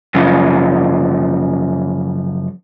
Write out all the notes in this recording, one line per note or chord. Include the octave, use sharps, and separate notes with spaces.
F#2 C#3 F3